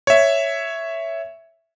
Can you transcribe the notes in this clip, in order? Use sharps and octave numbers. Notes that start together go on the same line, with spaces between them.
C#5 E5